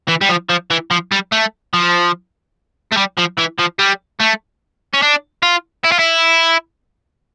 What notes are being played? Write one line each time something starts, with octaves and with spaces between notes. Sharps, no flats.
E3
G3
F3
F3
E3
F3
G3
A3
F3
A3
G3
F3
E3
F3
G3
A3
C#4
D4
F4
E4
F4
E4